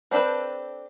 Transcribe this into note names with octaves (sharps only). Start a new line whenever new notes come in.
C4 D4 G4 A4 B4